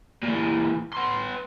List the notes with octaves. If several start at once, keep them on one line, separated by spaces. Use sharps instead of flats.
A#2 E3
B3 C6